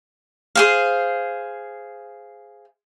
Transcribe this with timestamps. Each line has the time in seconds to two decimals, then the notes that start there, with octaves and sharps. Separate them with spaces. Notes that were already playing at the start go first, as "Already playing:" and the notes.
0.55 G#4 C5 F5